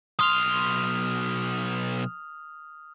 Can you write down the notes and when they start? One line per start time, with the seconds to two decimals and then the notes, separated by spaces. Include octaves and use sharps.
0.19 B1 C6 D#6 F6 F7